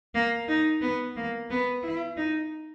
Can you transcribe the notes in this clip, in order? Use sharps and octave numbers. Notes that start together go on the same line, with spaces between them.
A#3
D#4
B3
A#3
B3
E4
D#4